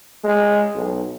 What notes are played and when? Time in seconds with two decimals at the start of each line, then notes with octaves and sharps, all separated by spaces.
0.24 G#3
0.75 B1